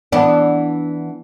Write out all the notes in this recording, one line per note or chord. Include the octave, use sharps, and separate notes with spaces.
E3 B3 D4